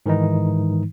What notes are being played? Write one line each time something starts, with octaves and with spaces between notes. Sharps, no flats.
G#2 D#3 E3 G#3 D#4